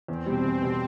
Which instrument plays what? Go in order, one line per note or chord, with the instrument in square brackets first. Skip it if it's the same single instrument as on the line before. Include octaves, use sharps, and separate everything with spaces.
[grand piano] E2 [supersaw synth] C4
[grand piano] B2 G3
E2
B2 G3